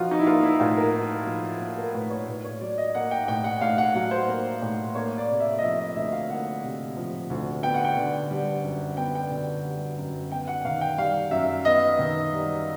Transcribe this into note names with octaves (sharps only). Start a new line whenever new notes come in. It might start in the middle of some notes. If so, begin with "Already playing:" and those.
Already playing: F3 D#4 F4 F#4
D#4
E4
A#3 F4
E4
A2 F4
A#4
D#4
F3
A#3
A#4
A2 B4
C#5
A2
C#5
F#3 D5
D#5
A#3 F#5
G5
F#5
A2 G5
F#5
A2 F5
F#5
F#3 F#5
C5
A#3
A2
A#3 C#5
D5
C3
E5
D#5
F3 E5
D#5
D2 E5
F5
A#3 F#5
C3
F3
D2
B3 G5
F#5
G5
D3
G3
F#2
B3 G5
G5
D3
G3
F#2
B3 G5
F#5
D#3 F5
G5
G3 F5
F#2 E5
B3 D#5
D#3
G3